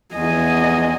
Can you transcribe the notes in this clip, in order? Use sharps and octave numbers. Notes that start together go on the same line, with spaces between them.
E2 D#5 G#5